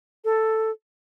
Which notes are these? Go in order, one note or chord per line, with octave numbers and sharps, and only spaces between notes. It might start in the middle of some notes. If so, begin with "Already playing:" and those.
A4